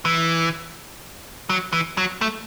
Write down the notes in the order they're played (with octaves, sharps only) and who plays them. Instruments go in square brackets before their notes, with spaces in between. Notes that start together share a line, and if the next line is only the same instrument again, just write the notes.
[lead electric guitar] E3
F#3
E3
F#3
A3